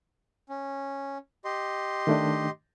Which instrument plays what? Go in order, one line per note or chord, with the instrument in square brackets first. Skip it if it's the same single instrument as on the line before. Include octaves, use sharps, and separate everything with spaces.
[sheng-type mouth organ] C#4
G4 D#5 C6
[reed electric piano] D#3 A3 D4